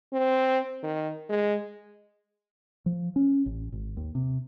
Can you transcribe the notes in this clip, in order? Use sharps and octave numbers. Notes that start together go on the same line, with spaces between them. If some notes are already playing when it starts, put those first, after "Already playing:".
C4
D#3
G#3
F3
C#4
A1
G#1
D#2
C3